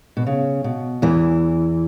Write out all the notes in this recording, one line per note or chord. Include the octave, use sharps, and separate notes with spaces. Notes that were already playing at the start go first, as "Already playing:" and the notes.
B2
C#3
B2
E2 E3